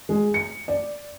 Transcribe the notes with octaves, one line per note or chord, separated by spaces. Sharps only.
G#3
C#7
D5